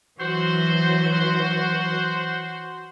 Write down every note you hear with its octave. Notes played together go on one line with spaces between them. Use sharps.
E3 F#3 F#4 C5